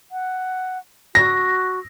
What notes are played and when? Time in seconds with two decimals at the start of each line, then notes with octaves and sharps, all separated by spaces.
0.12 F#5
1.15 F#4 A#6